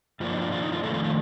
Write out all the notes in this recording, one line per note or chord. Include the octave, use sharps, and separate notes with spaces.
G2 F3 A#3 D4 F4
D#4
F4
F4
D#4
F4
F2 D#3 A3 F4 A4
F4
F4